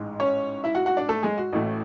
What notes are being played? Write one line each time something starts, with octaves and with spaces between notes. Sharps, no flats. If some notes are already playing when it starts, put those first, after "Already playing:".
Already playing: A1 G#2 G#3
C#4 C#5
E4 E5
F#4 F#5
F#4 F#5
D4 D5
A3 A4
G#3 G#4
F#4
A1 A2 E3 A3